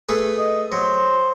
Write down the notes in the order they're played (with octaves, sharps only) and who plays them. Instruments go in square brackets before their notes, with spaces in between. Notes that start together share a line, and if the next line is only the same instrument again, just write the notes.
[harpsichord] A3 G#4 B4
[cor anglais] D#5
[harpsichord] F#3 [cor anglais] C5